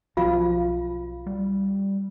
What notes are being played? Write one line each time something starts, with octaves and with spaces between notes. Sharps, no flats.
B1 F3 F4 F5
G3